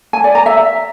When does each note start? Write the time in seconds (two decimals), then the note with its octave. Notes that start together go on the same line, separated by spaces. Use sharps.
0.13 G#5
0.24 D5
0.35 A#5
0.46 E5